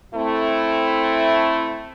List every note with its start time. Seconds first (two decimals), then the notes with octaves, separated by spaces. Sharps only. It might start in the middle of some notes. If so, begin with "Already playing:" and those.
0.15 A3 C4 E4